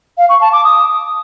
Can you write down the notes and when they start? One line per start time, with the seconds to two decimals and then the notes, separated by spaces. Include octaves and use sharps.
0.18 F5
0.29 C#6
0.41 A5
0.52 D6
0.64 D#6